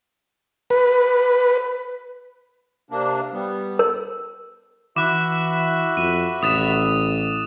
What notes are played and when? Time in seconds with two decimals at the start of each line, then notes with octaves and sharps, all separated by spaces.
0.70 B4
2.91 C3 A#3 D4
3.32 G3 B3
3.79 A#4
4.96 E3 F#4 E5 B5 D6 F#6
5.97 F2 D#7
6.43 A1 D#6 A6 E7